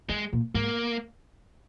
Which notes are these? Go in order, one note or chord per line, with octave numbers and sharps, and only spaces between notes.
D#3 G#3
A#2
G#2 A#3